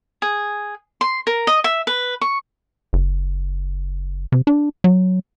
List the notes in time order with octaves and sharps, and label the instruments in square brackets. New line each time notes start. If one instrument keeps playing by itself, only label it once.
[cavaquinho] G#4
C6
A#4
D#5
E5
B4
C#6
[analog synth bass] F#1
C3
D4
F#3